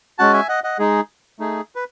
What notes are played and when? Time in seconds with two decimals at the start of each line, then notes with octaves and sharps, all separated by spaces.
0.18 G#3 C#4 F#4 F#5 A5
0.34 E5 G#5
0.49 D#5 F#5
0.64 D#5 F#5
0.79 G#3 D#4 G#4
1.40 A3 D#4 G#4
1.75 B4